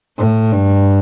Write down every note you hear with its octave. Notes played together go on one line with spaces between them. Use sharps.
A2
G2